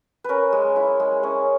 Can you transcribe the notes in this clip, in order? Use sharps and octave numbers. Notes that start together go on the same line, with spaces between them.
C#4 A#4 B4
G#3
E4
G#3
C#4